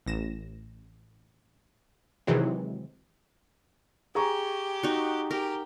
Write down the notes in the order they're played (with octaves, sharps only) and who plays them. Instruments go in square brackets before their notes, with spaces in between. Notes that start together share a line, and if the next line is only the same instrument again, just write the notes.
[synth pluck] A1 A#6 E7
C3 D#3 E3 F#3 G#3 C4
[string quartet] G4 [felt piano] G#4 A#5 C#6
[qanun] D#4 F#4
[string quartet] G4 [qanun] A#4